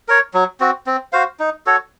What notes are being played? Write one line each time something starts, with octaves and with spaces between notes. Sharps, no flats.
A#4 C#5
F#3
C4 F#4
C4
F#4 C5 F5
D#4
F#4 A4 C#5